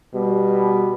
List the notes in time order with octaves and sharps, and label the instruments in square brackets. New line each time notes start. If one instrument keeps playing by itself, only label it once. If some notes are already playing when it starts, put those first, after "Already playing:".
[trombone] B2 [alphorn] G3